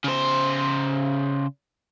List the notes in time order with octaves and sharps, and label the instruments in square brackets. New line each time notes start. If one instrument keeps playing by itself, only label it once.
[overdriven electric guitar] C#3 C5